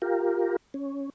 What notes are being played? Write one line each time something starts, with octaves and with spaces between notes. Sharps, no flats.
F4 G4 A#4
C#4